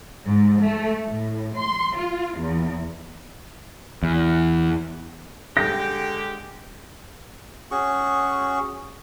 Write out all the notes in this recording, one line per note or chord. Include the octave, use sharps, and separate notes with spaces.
G#2
A3
A2
C6
F4
E2
E2
D3 G#3 G4 G5 A#6
C#4 F#4 G#4 C#6